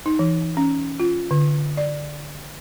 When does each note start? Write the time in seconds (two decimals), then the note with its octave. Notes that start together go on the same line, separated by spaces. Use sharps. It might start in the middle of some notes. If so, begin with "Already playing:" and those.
0.06 D#4
0.19 E3
0.57 C#4
1.00 F4
1.31 D3
1.77 D5